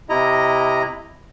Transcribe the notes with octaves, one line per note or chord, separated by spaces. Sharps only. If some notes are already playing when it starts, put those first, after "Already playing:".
C3 E4 D#5 A#5